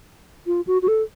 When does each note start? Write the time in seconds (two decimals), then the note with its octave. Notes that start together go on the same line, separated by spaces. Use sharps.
0.47 F4
0.67 F#4
0.82 F#4
0.88 A4